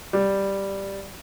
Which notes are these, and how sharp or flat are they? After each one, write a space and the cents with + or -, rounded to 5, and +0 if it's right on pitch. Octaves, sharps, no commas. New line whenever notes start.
G3 +0